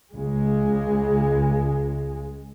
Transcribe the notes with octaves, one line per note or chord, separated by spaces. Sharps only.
C#2 G#3